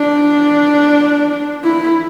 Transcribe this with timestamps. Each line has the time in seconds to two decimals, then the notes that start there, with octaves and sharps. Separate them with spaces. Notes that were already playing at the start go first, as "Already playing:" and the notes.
Already playing: D4
1.64 E4